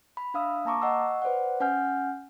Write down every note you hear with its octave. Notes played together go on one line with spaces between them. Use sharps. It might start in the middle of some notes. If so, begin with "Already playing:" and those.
B5
D4 E5 F5 D#6 E6
A#3 A5 A#5 C#6 D6
D#5 F#5 C#6 E6
B4 C5 D5 F#5
C#4 F#5 G#5 F6 G6